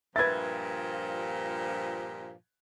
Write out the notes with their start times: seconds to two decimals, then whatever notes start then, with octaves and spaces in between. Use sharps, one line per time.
0.16 G2 A#2 F3 B4 E5 G#6 A6